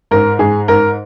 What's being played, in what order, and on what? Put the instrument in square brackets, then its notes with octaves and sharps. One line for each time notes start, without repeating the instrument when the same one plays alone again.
[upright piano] G#2 A#4
G#2 G#4
G#2 A#4